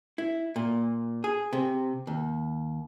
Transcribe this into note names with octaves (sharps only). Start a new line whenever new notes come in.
E4
A#2
G#4
C3
D#2